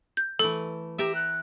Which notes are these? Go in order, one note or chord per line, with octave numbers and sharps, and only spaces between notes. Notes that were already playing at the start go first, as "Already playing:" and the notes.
G6
E3 A3 A4
G4 E5 G5 A#5
F#6